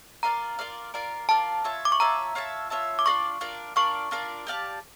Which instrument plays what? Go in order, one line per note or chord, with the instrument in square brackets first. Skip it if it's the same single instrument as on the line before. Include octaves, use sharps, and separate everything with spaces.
[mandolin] F4 A#4 D5 F5 [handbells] A#5
[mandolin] F4 A#4 D5 F5
F4 A#4 D5 F5
[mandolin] F4 A#4 D5 F5 [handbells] A5
[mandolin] F4 C#5 E5 A5
[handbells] D6
C#6
[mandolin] F4 C#5 E5 A5 [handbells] A#5
[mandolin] F4 C#5 E5 A5
F4 C#5 E5 A5
[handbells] D6
[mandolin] D4 F4 A#4 D5 [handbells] C#6
[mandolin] D4 F4 A#4 D5
[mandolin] D4 F4 A#4 D5 [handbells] C#6
[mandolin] D4 F4 A#4 D5
G4 D5 F5 A5